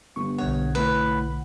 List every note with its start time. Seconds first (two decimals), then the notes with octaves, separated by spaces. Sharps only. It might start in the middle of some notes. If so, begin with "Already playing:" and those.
0.16 G1 C#6
0.38 B1 D3 C#5 F#5
0.75 A2 B4